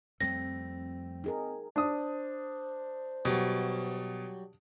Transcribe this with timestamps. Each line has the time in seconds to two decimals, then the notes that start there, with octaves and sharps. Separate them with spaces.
0.20 F2 G3 A3 C4 A#6
1.24 D#4 G#4 A#4
1.76 D4 C5 D#6
3.25 B2 F#3 G3